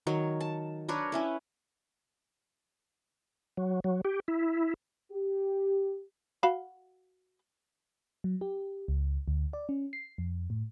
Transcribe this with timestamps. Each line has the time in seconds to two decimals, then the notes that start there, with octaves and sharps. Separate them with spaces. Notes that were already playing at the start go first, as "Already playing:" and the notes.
0.07 D#3 F#3 C#5
0.41 A5
0.88 D4 A#4 B4 C#5
1.12 C#4 E4 B4
3.57 F#3
3.84 F#3
4.05 G4
4.28 E4
5.12 G4
6.43 F#4 F5 B5
8.24 F#3
8.41 G4
8.88 C#2
9.28 D2
9.53 D5
9.69 C#4
9.93 C7
10.18 F2
10.50 A2